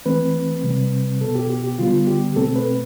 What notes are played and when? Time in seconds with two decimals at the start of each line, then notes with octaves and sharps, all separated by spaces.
0.05 E3 A3 C4 B4
0.63 C3 G3 C4
1.21 B2 B3 A4
1.35 G4
1.50 G4
1.64 G4
1.78 D3 G3 B3 F4
2.07 G4
2.36 B2 A3 C4 A4
2.56 B4